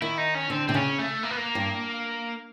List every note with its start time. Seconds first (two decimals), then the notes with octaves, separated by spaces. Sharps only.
0.02 D#3 E4
0.18 D#4
0.35 C#4
0.50 D3 C4
0.68 C3 C4
0.74 C#3 C#4
0.99 A3
1.23 A#3
1.30 B3
1.37 A#3
1.55 G2